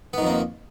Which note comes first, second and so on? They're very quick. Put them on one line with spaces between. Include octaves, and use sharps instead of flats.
B3 D#3 F2 A#3